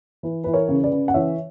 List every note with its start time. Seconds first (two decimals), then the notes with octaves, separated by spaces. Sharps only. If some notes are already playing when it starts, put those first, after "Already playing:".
0.23 E3 B4
0.44 E3 B4
0.54 A#4 C#5
0.68 C#3
0.84 B4 D5
0.92 C#3
1.08 F#5
1.14 E3 C#5 E5